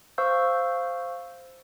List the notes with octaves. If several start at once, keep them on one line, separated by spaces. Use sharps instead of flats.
C5 F5 C#6 E6 G6